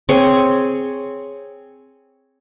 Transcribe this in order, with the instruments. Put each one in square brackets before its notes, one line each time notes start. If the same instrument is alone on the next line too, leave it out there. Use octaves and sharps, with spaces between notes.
[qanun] C4 G#4 C#5